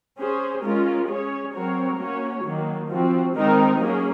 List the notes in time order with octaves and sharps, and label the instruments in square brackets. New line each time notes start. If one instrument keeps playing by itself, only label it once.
[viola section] C#4 G#4 C5
G#3 C#4 F4 A#4
C#4 G#4 C#5
F#3 C4 F#4 A#4 C#5
A#3 C#4 F#4 C#5
D#3 F#3 A#3
F3 C4 F#4
D#3 G#3 C4 D#4 A#4
F#3 A#3 C#4 G#4